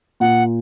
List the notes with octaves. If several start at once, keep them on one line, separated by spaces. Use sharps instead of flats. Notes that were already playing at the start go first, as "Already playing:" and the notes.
A#2 F#5